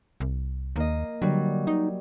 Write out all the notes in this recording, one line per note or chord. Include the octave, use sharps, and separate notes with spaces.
C2
D#2 A#3 D#5
D3 F#3 G3
D#4